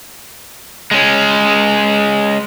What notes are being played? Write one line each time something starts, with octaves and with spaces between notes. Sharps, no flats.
G#3 C#4